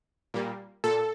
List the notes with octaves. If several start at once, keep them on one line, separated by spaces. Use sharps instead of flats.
A#2 G3 A#3
A#2 A4